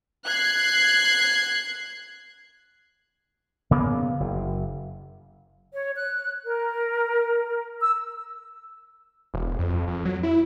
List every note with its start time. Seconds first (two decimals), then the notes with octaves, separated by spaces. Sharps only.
0.26 F#6 G#6 C7
3.71 C#3 A#3 B3
4.20 F#1
5.74 C#5
5.96 F#6
6.45 A#4
7.81 E6
9.34 E1
9.59 F2
9.87 F2
10.05 F#3
10.23 E4